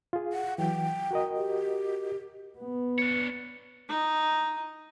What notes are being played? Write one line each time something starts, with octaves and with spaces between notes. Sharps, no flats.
F4 G#4
F#5
E3 F#3 G5
F#4 A#4 D#5
G4
B3
D4 C#5
D#4